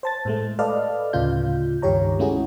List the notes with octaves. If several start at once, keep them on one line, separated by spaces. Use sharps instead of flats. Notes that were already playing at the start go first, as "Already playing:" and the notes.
C5 A5 A6
A2 G#3 A3
A4 B4 D5 D#5 F5 F6
D2 A2 C#3 F4 G6
C#2 G2 D#3 G4 C#5 A#5
G#3 A3 C#4 E4 F#4 G#4